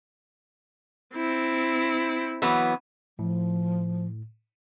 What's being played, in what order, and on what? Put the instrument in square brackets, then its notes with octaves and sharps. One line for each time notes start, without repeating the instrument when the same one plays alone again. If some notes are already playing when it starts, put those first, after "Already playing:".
[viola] C4 E4
[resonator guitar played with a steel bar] E3 F#3 B3
[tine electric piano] A2 [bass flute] F3